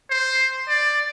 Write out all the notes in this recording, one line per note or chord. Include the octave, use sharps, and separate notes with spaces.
C5
D5